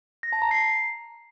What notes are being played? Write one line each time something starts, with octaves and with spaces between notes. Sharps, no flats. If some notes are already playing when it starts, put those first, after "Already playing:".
A#6
A5
A#5
C7